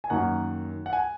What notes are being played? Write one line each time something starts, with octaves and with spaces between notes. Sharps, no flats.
G#5
F#2 D#3 A#3 F#5
F#5
G#5